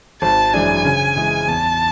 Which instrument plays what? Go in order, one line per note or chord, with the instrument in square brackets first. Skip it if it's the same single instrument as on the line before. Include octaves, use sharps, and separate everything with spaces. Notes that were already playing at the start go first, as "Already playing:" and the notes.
[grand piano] G#1 [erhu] A5
[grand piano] F#2 E3 G#3 D4 [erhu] G#5
[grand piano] C#3
E3 G#3
[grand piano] E2 [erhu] A5